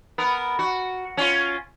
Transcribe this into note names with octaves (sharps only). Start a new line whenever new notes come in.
B3 A#4
F#4
C#4 F4